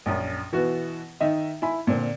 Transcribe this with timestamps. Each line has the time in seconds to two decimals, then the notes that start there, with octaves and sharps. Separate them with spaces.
0.06 A#1 F#2
0.52 B2 E3 B3 F#4
1.21 D#3 D#4 D#5 E5
1.62 E4 G#5 B5
1.87 A#2 D3 C4